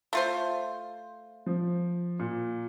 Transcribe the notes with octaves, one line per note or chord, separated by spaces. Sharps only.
A3 F4 C5
F3
A#2